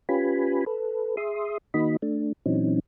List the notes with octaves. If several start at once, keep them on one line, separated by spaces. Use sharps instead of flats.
C#4 F4 G4 B4 G#5 B5
A4 B4
G#4 E5 C6 D#6
D#3 A#3 D#4 F#4 D#5 B5
A3 D4
A#2 E3 F#3 C4 C#4 D#4